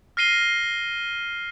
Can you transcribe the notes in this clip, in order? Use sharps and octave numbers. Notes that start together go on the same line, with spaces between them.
F6 A#6 C7 D#7 G7